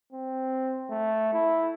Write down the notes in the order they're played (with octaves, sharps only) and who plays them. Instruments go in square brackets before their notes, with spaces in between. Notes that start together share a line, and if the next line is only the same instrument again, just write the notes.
[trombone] C4
A3
E4